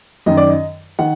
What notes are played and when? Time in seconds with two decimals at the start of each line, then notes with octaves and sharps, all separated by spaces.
0.26 F#2 D#3 D#5
0.37 D5
0.49 D#5
0.99 D#3 F#5